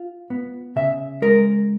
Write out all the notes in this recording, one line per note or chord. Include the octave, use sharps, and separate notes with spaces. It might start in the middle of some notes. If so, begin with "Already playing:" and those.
Already playing: F4
B3
C#3 E5
G#3 A#4